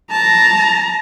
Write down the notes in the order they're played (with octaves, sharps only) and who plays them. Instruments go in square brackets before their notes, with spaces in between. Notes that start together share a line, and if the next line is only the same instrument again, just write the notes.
[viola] A5 [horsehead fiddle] A#5